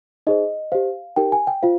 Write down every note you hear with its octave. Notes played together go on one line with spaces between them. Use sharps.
D#4 G#4 C5 D#5
G4 C5 F5
D#4 G4 A#4 G5
G#5
G5
F4 C5 F5